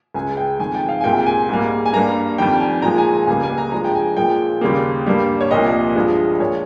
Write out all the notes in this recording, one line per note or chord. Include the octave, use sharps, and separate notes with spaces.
C#2 C#3 G#3 G#5
G5
F2 D#3 G#3 G#5
G5
F5
G#5
C2 A#2 G#3 G5
G#5
G#2 G3 A#3
G#5
G2 G3 A#3 A#5
F2 D#3 G3 G5
G#5
A#2 F3 G#3 A#5
G#5
G#5
C#2 C#3 G3 A#3 G#5
G#5
A#5
G2 F3 G#3 A#5
G5
G#5
A#2 F3 G#3 G5
D#2 C#3 G3 A#3
G2 G3 A#3
C#5
C2 A#2 F3 A#3 D#5
G2 F3 G#3
A#2 G#3 C#5